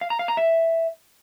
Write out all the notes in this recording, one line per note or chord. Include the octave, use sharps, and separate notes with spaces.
F5
A#5
F5
A#5
E5